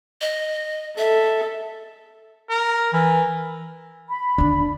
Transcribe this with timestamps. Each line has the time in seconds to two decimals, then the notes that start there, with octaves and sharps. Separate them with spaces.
0.21 D#5
0.98 A4 E5
2.50 A#4
2.93 E3 A#4
4.09 B5
4.38 D#2 D3 D4